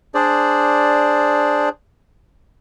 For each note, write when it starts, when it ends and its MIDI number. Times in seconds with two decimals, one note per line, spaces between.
0.15 1.69 62
0.15 1.69 68
0.15 1.69 72
0.15 1.69 74